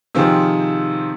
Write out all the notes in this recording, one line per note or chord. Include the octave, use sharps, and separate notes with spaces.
C3 D#3 F3 C4 G#4